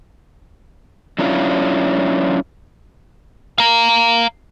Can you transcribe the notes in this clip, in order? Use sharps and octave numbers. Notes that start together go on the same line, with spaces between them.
F#3 C#4 D4 E4 F4
F5 A#5